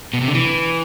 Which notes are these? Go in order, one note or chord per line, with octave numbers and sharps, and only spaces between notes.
B2
C3
D3
E3